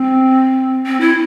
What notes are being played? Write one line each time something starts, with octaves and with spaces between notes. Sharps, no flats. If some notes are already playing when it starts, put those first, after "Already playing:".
Already playing: C4
C4
E4